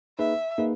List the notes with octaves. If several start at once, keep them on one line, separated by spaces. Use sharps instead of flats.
A#3 D#4 G#4 B4 E5
A#3 D#4 G#4 B4